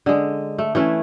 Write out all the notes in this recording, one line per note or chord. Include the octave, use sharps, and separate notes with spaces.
D3 G#3
A3
E3 A3 C#4 B4